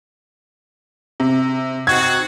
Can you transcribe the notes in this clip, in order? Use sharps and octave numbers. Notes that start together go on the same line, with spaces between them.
C3
C4 D#4 F#4 G#6